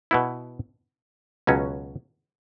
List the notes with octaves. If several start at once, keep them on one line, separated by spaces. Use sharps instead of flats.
B2 B3 E4
C#2 B2 F#3 C#4